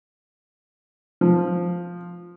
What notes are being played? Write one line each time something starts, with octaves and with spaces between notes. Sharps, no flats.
F3